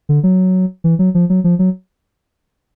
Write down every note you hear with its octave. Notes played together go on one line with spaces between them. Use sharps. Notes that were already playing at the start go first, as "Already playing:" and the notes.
D3
F#3
E3
F#3
F3
F#3
F3
F#3